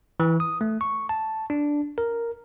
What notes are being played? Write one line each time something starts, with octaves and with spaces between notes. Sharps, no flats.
E3
D#6
A3
C#6
A5
D4
A#4